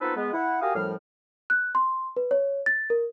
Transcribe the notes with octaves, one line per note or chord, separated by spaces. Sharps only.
B3 C4 D#4 F4 A4 B4
G#3 B3
E4 F#5
F#4 G4 A#4 F5 G#5 D#6
F#2 A2 F3 G3 F6
F#6
C6
B4
C#5
A6
A#4